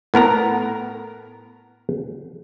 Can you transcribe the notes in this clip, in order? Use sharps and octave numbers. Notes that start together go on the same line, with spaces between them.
A2 B3 A#4 A#5